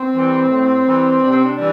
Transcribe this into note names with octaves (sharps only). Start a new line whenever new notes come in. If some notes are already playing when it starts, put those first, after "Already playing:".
Already playing: C4
E3 G3
A2
E3 G3
C3 D4
C4
D4
E3 G3